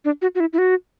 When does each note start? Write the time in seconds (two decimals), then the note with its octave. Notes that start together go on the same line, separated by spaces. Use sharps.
0.05 D4
0.22 F#4
0.35 F#4
0.40 E4
0.53 E4
0.58 F#4